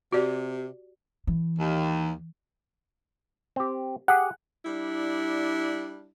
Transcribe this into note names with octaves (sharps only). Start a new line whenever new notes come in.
C3 F#4 G4 D5
E3
D#2
C4 G4
G4 G#4 F#5
G3 D4 E4